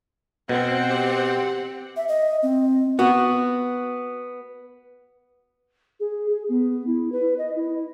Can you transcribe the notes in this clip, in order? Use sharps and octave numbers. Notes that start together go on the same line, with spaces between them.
B2 C4 F#5
G4
E5
D#5
C4
B3 F#4
G#4
G#4
B3
E4
B4
D#5
E4